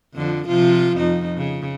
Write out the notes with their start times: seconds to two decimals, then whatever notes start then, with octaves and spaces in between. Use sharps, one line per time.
0.14 F2 D3 F3
0.47 C3 F3 F4
0.97 F2 D#4
1.37 C#3